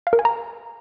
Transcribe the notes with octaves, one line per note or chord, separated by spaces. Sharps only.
F5
A#4
G#5
A#5